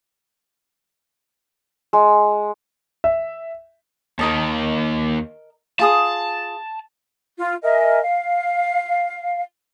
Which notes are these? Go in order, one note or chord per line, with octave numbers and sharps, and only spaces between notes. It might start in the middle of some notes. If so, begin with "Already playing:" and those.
G#3
E5
D#2 D#3 A#4 D#5 A5
F4 G#4 A5 D#6
F4
A#4 D#5 E5 G#5
F5